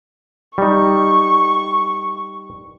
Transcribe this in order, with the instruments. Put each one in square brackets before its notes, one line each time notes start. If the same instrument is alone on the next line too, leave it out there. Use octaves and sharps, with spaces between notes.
[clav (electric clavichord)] G3 D#4 [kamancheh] C#6